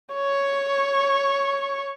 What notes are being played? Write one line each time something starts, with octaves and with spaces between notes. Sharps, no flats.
C#5 C#6